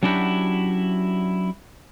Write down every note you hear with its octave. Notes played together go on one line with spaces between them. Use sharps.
F#3 C#4 D4 E4 F#4 G4